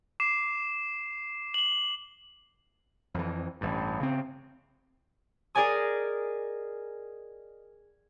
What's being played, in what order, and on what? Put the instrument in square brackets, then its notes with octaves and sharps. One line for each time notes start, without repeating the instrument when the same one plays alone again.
[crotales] D6 C7 E7
F#7 G7
[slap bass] F2 E3
A1 G2
C#3 C4
[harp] G#4 A#4 D5 D#5 G#5 D#6